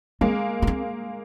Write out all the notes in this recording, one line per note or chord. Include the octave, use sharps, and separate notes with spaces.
G#3 A#3 C4
B3
C4